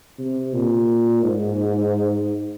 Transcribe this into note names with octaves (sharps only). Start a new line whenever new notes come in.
C3
A#2
G#2